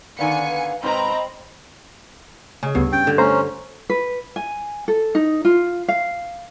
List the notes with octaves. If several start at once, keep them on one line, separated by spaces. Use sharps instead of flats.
D3 D#3 B3 D5 F5 G#5 C#7
B4
G#2 C3 C4 B4 D#5 A#5 B5
C#3 G#4 D#5
D2 G2 B3 C7
C#4 G5 A6
D3
A3 B3 C#4 C5 A#5
B4
G#5
A4
D#4
F4
F5